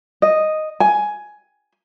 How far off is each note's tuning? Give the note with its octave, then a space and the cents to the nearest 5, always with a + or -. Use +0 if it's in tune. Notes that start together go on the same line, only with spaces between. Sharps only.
D#5 +0
G#5 +10